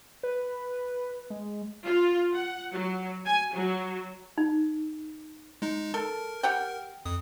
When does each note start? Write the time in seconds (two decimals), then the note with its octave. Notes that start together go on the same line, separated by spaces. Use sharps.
0.23 B4
1.30 G#3
1.85 F4
2.34 F#5
2.72 F#3
3.25 G#5
3.54 F#3
4.38 D#4
5.62 G#3 D#4
5.94 A4 A#4
6.43 G4 F#5 G5
7.05 F2 D#6